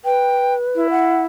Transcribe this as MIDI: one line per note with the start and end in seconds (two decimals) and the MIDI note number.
0.05 0.88 71
0.05 0.54 79
0.75 1.26 64
0.90 1.22 78